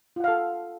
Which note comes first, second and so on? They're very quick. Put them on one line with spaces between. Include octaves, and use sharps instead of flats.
F4 F#5 F5 A4